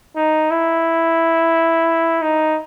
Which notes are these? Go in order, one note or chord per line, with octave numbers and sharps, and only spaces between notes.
D#4
E4
D#4